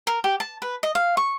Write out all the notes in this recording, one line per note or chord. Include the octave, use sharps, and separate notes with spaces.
A#4
G4
A5
B4
D#5
F5
C#6